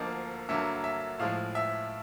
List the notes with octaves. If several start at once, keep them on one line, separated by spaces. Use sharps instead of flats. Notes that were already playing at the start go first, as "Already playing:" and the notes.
Already playing: D2 D3 F3 A#3 D#5
G2 D3 F#3 A#3 E5
E5
A2 F3 G#3 F5
E5